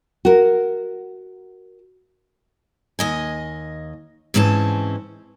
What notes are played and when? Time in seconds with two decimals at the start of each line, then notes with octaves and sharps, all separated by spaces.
0.25 F#4 A#4
2.99 D#2 D#5 G#5
4.34 G#2 E3 C4 C#4 A5